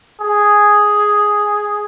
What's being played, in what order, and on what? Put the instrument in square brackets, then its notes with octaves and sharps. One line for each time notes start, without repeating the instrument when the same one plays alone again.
[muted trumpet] G#4